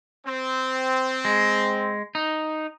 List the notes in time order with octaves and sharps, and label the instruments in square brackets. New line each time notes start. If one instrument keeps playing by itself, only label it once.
[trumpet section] C4
[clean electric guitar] G#3
D#4